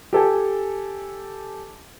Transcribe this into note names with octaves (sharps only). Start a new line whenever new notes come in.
G4 A4 G#5